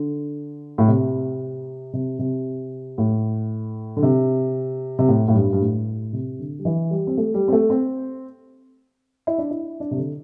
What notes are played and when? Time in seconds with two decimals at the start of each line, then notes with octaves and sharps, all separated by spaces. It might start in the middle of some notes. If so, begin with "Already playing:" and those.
Already playing: D3
0.78 A2
0.88 C3
1.93 C3
2.19 C3
2.98 A2
3.97 D3
4.03 C3
4.99 C3
5.08 A2
5.28 A2
5.34 G2
5.53 G2
5.61 A2
6.13 C3
6.39 D3
6.59 G3
6.65 E3
6.91 G3
7.07 C4
7.17 A3
7.34 G3
7.48 C4
7.52 A3
7.70 C4
9.27 E4
9.38 D4
9.50 E4
9.80 D4
9.91 C3
9.97 D3